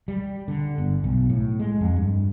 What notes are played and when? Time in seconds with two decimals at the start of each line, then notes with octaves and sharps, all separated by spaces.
0.08 G3
0.48 D3
0.78 G1
1.04 B1
1.29 A2
1.59 G#3
1.81 F2
1.96 G2